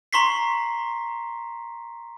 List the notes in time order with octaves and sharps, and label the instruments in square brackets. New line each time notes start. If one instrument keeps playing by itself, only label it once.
[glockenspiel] A#5 C6 C#6 B6 C7